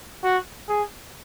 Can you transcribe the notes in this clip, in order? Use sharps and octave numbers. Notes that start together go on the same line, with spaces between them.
F#4
G#4